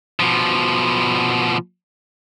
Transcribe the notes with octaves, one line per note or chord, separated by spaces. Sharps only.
B2 F3